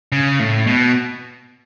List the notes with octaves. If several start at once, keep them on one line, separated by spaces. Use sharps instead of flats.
C#3
A2
B2